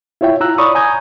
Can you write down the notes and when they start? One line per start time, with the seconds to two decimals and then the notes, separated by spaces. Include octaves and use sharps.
0.21 E4 F4 C#5 E5 G5
0.40 E4 F4 A#5 E6 F#6
0.58 C#5 D5 B5 C#6 D#6
0.75 G#5 A#5 D#6 G6 G#6